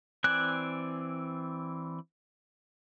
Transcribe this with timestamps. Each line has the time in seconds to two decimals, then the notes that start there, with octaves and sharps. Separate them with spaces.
0.24 E3 C4 D5 G#5 F#6